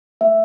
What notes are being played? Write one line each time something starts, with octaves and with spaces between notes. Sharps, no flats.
A3 E5